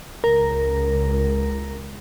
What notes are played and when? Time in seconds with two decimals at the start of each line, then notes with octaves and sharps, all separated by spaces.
0.24 C#2 A#4